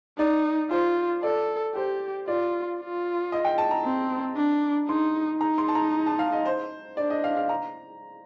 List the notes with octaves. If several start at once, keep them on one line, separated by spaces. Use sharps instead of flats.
D#4 D5
F4 C5
A4 D5
G4 C5
F4 D5
F4
D#5
G5
A5
A#5
C4
D4
D#4 C6
D#4 A#5
C6
A5
A#5
A5
F5
D#5
C5
D4 D5
D#5
F5
F5
A#5